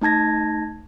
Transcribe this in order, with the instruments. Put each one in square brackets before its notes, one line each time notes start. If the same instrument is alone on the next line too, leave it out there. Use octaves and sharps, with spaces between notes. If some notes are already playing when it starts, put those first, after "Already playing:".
[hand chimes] A3 D#4 A5 G#6 A#6